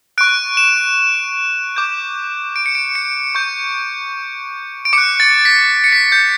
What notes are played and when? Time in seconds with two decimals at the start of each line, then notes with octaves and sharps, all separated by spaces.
0.18 C#6 F#6 D7
0.57 E7
1.76 D6 G6
2.56 D7
2.66 C#7
2.75 D7
2.95 C#7
3.35 C#6 G6
4.85 D7
4.93 D6 F#6 C#7
5.20 A6
5.45 B6
5.84 C#7
5.92 B6
6.12 G6